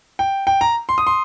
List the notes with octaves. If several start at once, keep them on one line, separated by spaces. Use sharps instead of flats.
G5
G5
A#5
C6
D#6
C6